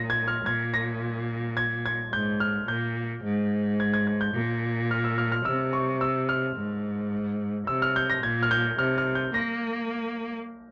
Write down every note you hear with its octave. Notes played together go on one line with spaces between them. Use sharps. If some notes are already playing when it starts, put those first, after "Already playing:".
Already playing: A#2 A#6
G#6
F6
A#2 G#6
A#6
G#6
G#6
G#2 G6
F6
A#2 G6
G#2
G#6
G#6
G#6
G6
A#2
F6
E6
F6
F6
C3 E6
C#6
E6
F6
G#2
C3 E6
F6
G6
A#6
A#2 G#6
F6
G6
C3 F6
F6
G6
A#3 A#6